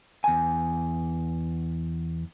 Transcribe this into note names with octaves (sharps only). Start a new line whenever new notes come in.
E2 G#5